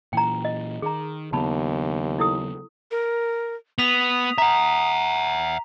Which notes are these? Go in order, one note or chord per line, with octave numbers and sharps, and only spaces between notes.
A#2 E3 G5 A#5
D#5
D#3 G#4 A#5
D#2 C#3 F#3 B3 A5 B5
E4 A4 D#6
A#4
B3 D#6 B6 F7
E5 F#5 A#5